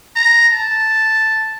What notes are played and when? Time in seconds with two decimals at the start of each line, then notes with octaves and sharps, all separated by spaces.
0.16 A#5
0.53 A5